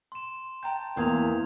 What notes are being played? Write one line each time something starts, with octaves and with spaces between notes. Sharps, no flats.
C6 E7
D5 G5 A5 A#5 G6
E2 A#3 G#4 C6 G6 G#6 F7